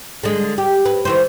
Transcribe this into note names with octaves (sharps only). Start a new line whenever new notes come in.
D3 G#3
G4
B4
D#3 E3 C5